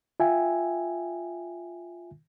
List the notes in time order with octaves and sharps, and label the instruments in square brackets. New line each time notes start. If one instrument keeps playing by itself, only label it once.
[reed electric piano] F4 E5 G5 G#5